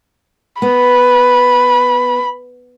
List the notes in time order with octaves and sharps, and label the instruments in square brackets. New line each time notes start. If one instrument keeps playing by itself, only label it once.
[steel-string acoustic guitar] B3 [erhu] B5